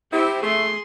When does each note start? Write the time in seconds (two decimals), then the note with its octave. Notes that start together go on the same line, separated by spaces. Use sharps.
0.12 C4 E4 G4
0.42 A3 G#4 C6